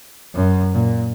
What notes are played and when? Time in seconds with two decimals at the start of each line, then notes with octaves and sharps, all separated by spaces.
0.35 F#2
0.73 A#2